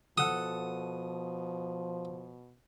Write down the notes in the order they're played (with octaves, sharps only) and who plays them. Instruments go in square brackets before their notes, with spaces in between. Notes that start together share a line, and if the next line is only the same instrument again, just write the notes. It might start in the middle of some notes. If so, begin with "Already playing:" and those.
[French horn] B2 [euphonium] F3 [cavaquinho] A4 F#5 [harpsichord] D#6